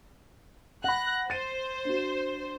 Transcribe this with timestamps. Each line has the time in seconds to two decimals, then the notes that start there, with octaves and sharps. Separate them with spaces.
0.84 F#5 B5 F#6 A#6
1.30 C5 A6 D#7
1.85 D4 F#4